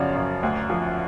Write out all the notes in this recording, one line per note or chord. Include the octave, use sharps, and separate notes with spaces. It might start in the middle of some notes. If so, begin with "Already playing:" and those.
Already playing: F#2 C#3 F3 C#5 D5 F5 F#5
F#2
D2
F3